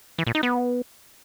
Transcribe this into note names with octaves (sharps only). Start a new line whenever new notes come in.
E3
A#2
D#4
B3